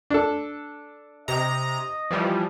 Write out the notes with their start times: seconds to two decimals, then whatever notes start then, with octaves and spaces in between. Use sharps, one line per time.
0.10 D4 A4
1.28 C3 D#5 A#5
2.11 E3 F3 G3